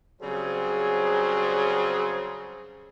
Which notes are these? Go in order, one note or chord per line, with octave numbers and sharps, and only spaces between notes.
C#3 F#3 G3 C4 G#4 C5